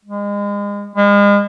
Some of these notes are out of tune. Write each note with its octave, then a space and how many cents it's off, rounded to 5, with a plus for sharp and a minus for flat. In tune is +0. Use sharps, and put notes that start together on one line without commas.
G#3 -35
G#3 -40